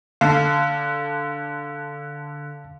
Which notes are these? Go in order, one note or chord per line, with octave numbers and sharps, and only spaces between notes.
D3 F5 A5